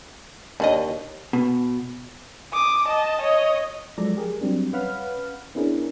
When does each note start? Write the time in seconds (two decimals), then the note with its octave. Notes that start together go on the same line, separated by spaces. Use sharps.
0.60 D#2 C#4 D4 D#5
1.33 B2
2.53 D6 D#6
2.88 D#5 A5
3.22 C#5 D#5
3.98 F3 F#3 G#3 A4 D5 A#5
4.17 G4 G#4 A#4
4.41 F#3 G3 C4 D4
4.73 C#4 B4 F5 F#5 B5 F6
5.55 B3 C#4 D4 E4 G#4 A#4